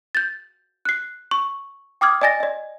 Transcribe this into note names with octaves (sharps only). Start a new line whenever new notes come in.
G6 A6
F#6 C7
C#6
G5 D6 D#6 F6 G#6
D5 D#5 G#5 A6 A#6
D5 D#5